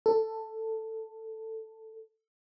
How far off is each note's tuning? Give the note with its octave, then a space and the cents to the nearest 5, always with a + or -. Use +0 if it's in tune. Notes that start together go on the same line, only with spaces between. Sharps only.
A4 +10